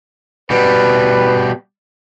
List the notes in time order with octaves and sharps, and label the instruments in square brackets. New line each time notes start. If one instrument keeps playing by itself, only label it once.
[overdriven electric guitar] B2 G3 [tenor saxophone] B4